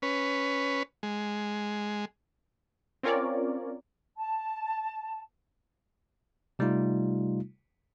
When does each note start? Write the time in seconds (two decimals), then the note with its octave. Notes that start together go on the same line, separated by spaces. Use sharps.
0.02 C#4 B4
1.03 G#3
3.03 C4 C#4 F4 A#4 C#5 D5
4.17 A5
6.59 C3 G3 A3 D#4 F4